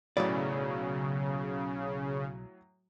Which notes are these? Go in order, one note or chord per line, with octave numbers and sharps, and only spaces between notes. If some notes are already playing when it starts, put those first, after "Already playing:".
B1 A2 C#3 F#3 D5 B5